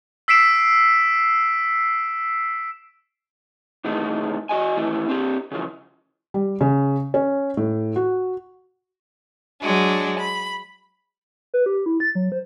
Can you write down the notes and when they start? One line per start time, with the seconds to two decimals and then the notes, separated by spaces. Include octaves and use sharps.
0.28 E6 B6 C7 D7 E7
3.84 C3 D#3 E3 G#3 A3 D#4
4.49 F#4 D#5 G#5
4.77 D#3 E3 A3 E4
5.09 C4 D4 G4
5.51 C#3 E3 F3
6.34 G3
6.61 C#3
7.14 C#4
7.57 A2
7.96 F#4
9.62 F#3 G#3 D4
10.19 B5
11.54 B4
11.66 G4
11.86 E4
12.00 A6
12.15 F#3
12.32 C5